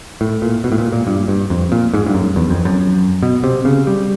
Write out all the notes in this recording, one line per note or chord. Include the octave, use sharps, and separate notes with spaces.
A2
A#2
B2
A2
A#2
A#2
G2
G2
F2
A#2
G#2
G2
F#2
E2
F2
F#2
B2
C3
C#3
G3